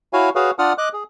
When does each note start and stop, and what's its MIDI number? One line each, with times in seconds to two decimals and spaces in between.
0.13 0.30 64
0.13 0.30 66
0.13 0.30 73
0.13 0.30 77
0.13 0.30 80
0.35 0.51 66
0.35 0.51 68
0.35 0.51 71
0.35 0.51 73
0.35 0.51 77
0.59 0.73 62
0.59 0.73 65
0.59 0.73 74
0.59 0.73 78
0.59 0.73 87
0.59 0.73 89
0.78 0.89 75
0.78 0.89 86
0.78 0.89 90
0.93 1.04 68